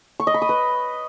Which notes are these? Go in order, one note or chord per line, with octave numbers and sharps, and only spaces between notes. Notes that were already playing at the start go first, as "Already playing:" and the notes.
C#6
D#5
B5
D#6
B4